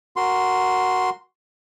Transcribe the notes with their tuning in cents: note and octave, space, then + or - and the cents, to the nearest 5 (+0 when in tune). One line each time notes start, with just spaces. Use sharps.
F#4 +0 A#4 +0 C6 +0